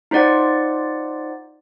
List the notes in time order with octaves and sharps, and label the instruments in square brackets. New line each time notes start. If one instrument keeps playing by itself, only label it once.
[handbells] D#4 F4 C5 D5 F#5